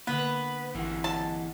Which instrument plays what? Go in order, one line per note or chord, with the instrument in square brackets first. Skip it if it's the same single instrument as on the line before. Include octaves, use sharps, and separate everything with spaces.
[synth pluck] D3 A#3 [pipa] B3 [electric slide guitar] B4
[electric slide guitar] B4
[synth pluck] A1 F#5 [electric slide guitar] E3 A#3
[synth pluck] D#5 [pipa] A5